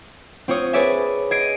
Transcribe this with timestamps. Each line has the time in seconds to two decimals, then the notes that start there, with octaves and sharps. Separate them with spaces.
0.48 C4 F4 C#5 D#6
0.73 G#4 B4 C#5 D5 E5 G#5
1.31 D#5 G#6 C7 D7 D#7